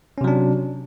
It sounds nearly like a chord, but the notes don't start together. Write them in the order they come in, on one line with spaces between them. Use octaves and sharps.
C#4 C3 F#3 D4